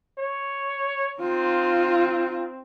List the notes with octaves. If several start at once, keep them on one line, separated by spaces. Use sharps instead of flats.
C#5
C4 D#4 F4